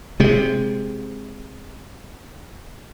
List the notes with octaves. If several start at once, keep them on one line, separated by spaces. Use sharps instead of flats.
C3 G#3